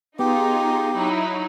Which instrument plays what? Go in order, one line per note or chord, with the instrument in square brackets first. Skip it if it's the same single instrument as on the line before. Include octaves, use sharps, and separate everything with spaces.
[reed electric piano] B3 [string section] D#4 F4 G#4 [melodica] G4
[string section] F#3 D#4 E4